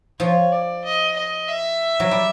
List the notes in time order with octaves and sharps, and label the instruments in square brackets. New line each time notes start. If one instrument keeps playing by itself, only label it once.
[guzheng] F3 [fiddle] C#5
[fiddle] D5
D#5
D#5
E5
[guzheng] F#3
G3